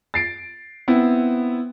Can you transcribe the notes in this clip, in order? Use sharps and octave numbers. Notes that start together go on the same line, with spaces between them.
A6 C7 D7
B3 C4 E4